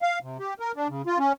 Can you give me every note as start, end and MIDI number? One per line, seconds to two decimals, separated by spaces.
0.02 0.19 77
0.23 0.37 48
0.40 0.54 67
0.60 0.72 70
0.76 0.88 62
0.89 1.02 49
1.07 1.18 65
1.19 1.33 61